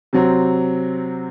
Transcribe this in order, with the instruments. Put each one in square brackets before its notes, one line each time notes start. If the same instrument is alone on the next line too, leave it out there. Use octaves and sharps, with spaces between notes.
[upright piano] C3 F#3 C4